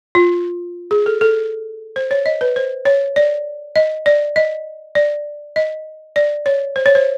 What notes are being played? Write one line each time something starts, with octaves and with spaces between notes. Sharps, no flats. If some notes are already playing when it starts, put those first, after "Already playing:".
F4
G#4
A4
A4
C5
C#5
D#5
B4
C5
C#5
D5
D#5
D5
D#5
D5
D#5
D5
C#5
C5
C#5
C5